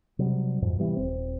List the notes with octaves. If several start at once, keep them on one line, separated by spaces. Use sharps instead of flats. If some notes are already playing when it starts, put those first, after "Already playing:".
C3 F#3 G3
F2 G#2
C3 E3 G3 B3
D#1 G#1 C4